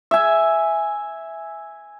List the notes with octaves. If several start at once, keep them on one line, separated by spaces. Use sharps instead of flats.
E5 G#5